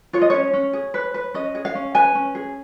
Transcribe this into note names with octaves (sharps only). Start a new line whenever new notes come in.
F4 C#5
D#5
C#4 C#5
C#4
G#4
B4
B4
C#4 D#5
G#4
F5
C#4
B4 G#5
C#4
G#4